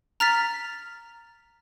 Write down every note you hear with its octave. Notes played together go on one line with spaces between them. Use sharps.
A#5 F6 A6 B6